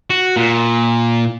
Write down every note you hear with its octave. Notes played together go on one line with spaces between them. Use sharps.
F#4
A#2